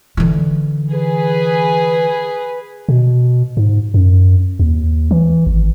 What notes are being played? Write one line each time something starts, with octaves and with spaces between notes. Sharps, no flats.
D3 E3
G#4 B4
B2
G#2
F#2
D#2
E3
G#1